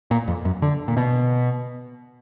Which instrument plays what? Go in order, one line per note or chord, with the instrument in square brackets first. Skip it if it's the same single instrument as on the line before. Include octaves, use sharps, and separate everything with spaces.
[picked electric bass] A#2
F2
F#2
D3
A#2
B2